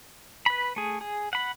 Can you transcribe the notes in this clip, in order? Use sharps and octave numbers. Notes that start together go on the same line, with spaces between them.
B4 B5
A3 G#4
G#4
F#5 B5